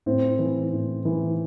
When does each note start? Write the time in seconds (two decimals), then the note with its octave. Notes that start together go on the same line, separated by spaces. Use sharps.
0.06 A2 C4
0.39 E3
0.73 A2
1.05 E3